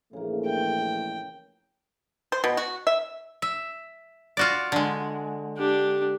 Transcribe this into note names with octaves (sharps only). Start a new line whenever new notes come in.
A#1 C#3 E3 A3 A#3
G5
C5
B2
F#4
E5
E5
F4 F#4 D5
D3 G#3
D4 G4